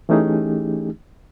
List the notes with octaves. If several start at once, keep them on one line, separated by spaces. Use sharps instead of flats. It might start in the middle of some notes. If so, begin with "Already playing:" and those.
E3 A3 C#4 D#4 G4 G#4